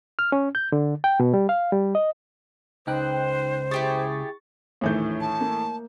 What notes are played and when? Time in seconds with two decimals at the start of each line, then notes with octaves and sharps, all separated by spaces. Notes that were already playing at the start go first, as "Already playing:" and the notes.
0.19 F6
0.32 C#4
0.55 G6
0.72 D3
1.04 G5
1.20 B2
1.34 G3
1.49 F5
1.72 G3
1.95 D#5
2.87 C#2 D#4 C5 G5 F#6
3.71 E4 G4 G#4 C#6 A6
4.81 A#1 D#2 A2 E3 A3 G6
5.20 A5
5.41 A#3